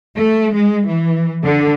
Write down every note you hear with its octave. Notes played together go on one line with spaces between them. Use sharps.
A3
G#3
E3
D3